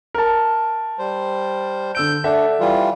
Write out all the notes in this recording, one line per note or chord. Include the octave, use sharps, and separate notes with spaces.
A#4 A5
G3 C5
D3 E6 G6 D7
D4 A4 E5 F#5
E3 G3 F4